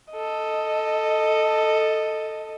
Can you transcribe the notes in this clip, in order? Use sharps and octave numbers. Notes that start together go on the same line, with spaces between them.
A4 D#5